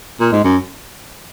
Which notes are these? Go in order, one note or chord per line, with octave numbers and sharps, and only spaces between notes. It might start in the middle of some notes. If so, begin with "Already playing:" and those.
A#2
G#2
F#2